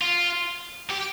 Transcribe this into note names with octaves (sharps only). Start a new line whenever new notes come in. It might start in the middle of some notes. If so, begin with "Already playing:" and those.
F4
G4